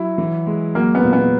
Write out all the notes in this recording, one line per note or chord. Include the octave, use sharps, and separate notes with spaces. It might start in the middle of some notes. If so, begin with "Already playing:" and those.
Already playing: F#3 E4
E3
G#3
F#3 A#3
B3
A#2
B3